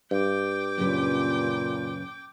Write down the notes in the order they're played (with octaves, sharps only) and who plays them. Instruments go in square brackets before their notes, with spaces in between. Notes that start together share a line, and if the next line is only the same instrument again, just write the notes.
[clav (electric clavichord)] G2 [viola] G5 D6
[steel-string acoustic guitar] F#2 C#3 B4 [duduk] A#2